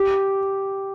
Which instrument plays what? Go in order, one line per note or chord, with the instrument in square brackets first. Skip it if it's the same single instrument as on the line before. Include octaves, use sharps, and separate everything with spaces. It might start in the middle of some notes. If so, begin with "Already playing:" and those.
Already playing: [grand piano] G4